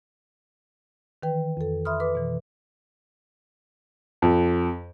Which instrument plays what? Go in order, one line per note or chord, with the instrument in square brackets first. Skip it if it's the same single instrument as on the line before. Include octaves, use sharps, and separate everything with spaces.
[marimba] D#3 E3 B4 G5
F2 A4
E5 B5 C6 D#6 F6
B4 D6
B2 E3
[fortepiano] F2